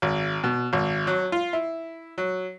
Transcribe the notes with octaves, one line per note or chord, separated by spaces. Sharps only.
G#1
B2
G#1
F#3
F4
E4
F#3